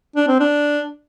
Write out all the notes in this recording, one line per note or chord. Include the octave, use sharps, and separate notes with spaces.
D4
C4
D4